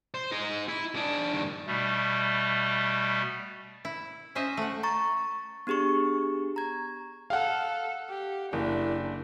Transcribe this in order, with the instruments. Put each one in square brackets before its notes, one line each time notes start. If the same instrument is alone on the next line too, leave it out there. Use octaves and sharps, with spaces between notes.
[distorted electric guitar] C5
D#4 G#4
E4
D4 G#4
G2 D#3
[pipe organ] B2 G3 A3
[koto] E4
C#4 C5 D#5 E5
A3 F#5
[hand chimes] A#5 C#6 A6
B3 D4 G4 G#4 C#6
A#5 G#6
[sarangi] A4 [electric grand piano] F5 F#5
[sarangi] G4
[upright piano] F#1 [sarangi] D4 [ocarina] E4